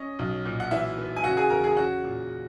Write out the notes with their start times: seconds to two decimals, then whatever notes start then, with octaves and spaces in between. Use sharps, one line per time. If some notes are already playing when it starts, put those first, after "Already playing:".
Already playing: C#4 D#5
0.19 B1
0.45 A#2
0.60 F#5
0.71 E3 E4 E5
0.98 B3
1.16 G#5
1.24 C#3 F#4 F#5
1.37 G#4 G#5
1.50 E2 A#4 A#5
1.64 G#4 G#5
1.77 C#4 F#4 F#5
2.04 A#2